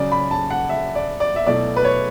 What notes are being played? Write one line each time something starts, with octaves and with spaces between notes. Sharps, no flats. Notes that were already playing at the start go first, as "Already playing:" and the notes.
Already playing: C#3 F#3 C#4 D5
B5
A5
F#5
E5
D5
D5
E5
B2 F#3 A3 E4 D5
B4
C#5